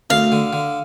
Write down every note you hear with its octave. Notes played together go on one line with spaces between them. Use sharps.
D2 F5
D3
D3